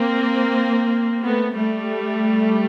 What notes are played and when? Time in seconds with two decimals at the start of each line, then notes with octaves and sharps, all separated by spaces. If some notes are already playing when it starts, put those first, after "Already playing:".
Already playing: A#3 C4
1.23 A3 B3
1.53 G3 A3